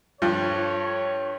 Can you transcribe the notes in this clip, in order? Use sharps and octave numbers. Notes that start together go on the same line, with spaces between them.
G2 F3 A4 C#5